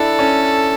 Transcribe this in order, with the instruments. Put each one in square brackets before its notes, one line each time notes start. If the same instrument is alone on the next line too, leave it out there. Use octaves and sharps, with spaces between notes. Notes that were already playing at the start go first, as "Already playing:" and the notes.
Already playing: [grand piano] D4 E4 [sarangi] A4
[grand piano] C#4